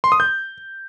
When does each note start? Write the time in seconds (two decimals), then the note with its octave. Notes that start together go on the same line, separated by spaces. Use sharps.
0.04 C6
0.12 D#6
0.20 G6